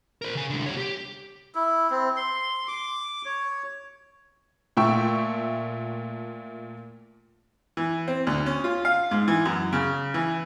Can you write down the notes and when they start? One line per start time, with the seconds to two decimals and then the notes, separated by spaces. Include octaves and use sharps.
0.22 A#4 C5
0.35 C#3 G#5
0.50 C2 D3
0.66 G3 C#5
0.77 G4
1.55 E4
1.90 C4
2.17 C6
2.68 D6
3.26 C#5
4.77 A#2 A3 E5 G5 C#6 E6
7.77 E3
8.08 C4
8.27 D2
8.46 C#4
8.64 F4
8.85 F5
9.11 G#2
9.28 E3
9.45 F#2
9.73 C#3
10.14 E3